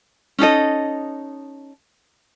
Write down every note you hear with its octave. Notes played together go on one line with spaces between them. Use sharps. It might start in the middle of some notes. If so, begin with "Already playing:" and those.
C#4 D#4 A4 D#5